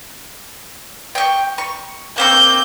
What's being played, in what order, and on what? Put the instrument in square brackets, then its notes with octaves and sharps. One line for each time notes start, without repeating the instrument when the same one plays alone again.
[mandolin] G5 C#6
C#6
[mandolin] A#3 C4 C#6 [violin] G6